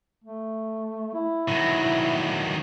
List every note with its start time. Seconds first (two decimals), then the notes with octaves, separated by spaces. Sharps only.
0.24 A3
1.14 E4
1.48 D#3 F#3